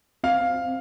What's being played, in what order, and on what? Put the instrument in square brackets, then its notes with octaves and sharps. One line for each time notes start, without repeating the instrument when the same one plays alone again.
[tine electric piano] C4 [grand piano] F5